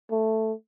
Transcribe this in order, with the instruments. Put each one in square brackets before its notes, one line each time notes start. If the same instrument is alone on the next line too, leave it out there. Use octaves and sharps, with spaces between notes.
[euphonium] A3